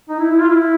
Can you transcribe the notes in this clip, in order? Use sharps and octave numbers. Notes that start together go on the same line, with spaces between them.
D#4
E4
E4
F4
E4